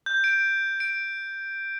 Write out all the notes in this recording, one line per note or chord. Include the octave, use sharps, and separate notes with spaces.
G6
D7
D7